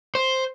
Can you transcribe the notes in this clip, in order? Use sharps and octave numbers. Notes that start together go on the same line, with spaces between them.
C5